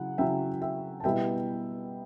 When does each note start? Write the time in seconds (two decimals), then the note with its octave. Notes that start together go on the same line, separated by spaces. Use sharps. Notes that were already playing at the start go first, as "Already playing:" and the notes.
Already playing: C#3 F#3 E4 F#5
0.18 C#3 F#3 C#4 E4 E5 G5
0.62 E5 G5
1.00 A5
1.04 B2 G3 B3 E4 E5 G5